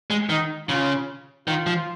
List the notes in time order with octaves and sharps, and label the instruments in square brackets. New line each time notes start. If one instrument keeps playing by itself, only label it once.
[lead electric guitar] G#3
[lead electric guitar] D#3 [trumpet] D#4
[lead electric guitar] C#3 [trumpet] F4
[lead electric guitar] D#3 [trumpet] F4
[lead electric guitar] F3